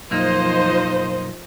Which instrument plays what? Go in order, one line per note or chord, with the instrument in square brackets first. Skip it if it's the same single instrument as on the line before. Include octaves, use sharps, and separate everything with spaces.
[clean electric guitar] B1 F#2 A#3 [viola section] F3 C5 [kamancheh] D#4 D#5